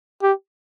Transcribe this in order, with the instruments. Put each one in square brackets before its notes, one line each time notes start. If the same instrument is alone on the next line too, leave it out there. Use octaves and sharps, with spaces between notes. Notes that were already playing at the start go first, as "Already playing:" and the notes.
[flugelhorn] G4